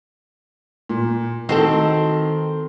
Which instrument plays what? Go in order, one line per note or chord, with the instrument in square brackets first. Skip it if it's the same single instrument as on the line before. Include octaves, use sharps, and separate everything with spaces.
[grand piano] A#2
[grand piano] D#3 [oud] C4 F#4 A4